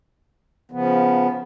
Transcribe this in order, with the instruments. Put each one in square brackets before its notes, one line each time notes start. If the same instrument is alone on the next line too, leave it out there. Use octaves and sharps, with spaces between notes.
[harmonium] C#3 F3 B3